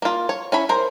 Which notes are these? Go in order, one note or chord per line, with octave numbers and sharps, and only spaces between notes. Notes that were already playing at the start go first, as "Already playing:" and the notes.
A#3 F4
C#5
C#4 E4 B5
A#4 C5